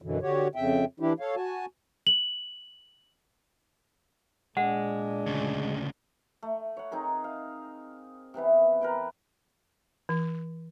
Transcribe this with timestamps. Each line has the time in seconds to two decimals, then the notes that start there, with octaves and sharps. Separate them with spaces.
0.02 F#2 B2 D3 E3
0.22 D3 F#4 G4 C#5
0.55 F2 C#3 E5 G5
1.00 E3 D4 E4 G4
1.20 A4 C#5 F5
1.36 F#4 G#5 A5
2.07 F#7
4.57 A#2 G#3 D4 F#5
5.26 D2 C#3
6.43 A3
6.77 C#5 F#5
6.91 C4 D#4 G#4 A#4
7.24 F5
8.34 C3 E3 B3 E4
8.81 A#4 B4 G5
10.09 E3